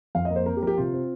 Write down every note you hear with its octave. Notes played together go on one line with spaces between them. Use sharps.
F2 F5
D#5
A#3
C5
C4 A#4
G4
F3 G4 A#4
C3 F4
C4